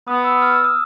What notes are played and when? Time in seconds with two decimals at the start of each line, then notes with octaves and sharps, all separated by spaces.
0.08 B3 D#6
0.24 E6
0.42 F6
0.53 E6
0.64 D#6